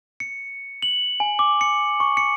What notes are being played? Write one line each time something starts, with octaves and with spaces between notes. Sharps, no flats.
C#7
F#7
G#5
D6
C#7
C#6
C#7